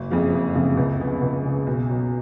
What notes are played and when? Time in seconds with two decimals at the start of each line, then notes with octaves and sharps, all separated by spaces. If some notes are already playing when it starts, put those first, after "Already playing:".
Already playing: F#1
0.10 F2 C#3 F3 G#3
0.32 F#1
0.55 F2 C#3 F3 G#3
0.77 C#2
0.99 C#3 G#3 B3
1.21 C#2
1.44 C#3 G#3 B3
1.67 B1
1.89 B2 F#3